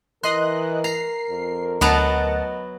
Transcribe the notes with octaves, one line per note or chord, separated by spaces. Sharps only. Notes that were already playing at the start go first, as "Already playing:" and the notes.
E3 A#4 D#5 C6 F#6
A#5 C7
F2
D2 F#3 B3 D#5 F#5 A5 A#5